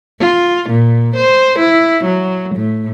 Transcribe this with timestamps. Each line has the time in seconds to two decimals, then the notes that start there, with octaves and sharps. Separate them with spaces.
0.20 F4
0.70 A#2
1.17 C5
1.59 E4
2.04 F#3
2.55 A2